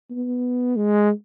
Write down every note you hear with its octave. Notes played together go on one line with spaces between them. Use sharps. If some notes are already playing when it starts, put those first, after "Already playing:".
B3
G#3